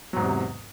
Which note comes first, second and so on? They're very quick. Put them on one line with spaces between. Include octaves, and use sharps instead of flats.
F#3 G#2 E2 C3